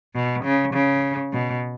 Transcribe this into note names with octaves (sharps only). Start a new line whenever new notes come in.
B2
C#3
C#3
B2